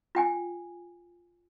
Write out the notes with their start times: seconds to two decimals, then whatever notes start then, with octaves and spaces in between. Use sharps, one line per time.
0.15 F4 G5 G#5